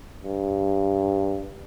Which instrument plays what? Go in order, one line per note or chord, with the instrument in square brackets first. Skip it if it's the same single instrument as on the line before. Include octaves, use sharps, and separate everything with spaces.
[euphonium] G2